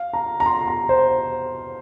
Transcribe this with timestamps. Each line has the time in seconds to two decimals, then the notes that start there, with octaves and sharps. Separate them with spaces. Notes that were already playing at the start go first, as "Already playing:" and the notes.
Already playing: F5
0.13 A#5
0.40 A#5
0.46 C6
0.68 A#5
0.89 C5